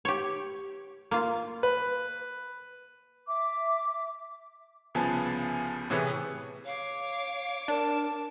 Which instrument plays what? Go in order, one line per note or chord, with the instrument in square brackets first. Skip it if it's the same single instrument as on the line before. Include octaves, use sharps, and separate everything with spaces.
[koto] G4 C#5
A#3 F4
[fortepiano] B4
[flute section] E5 D6
[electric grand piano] C2 C#3 F3 B3 G#5 A5
A2 C3 E3 G#4 B4 C#5
[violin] C#5 D6 [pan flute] F5
[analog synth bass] D4 [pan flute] A#4 [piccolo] A5